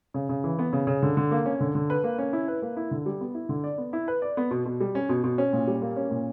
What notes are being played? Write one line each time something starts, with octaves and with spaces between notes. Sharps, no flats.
C#3
C#3
E3
B3
C#3
C#3
D3
D3
A#3
C#4
D3
D3
B4
A#3
C#4
E4
B4
A#3
E4
D3
G3
B3
E4
D3
D5
B3
E4
B4
D5
B3
B2
B2
G3
C#4
B2
B2
C#4
A#2
G3
A#3
C#4
A#2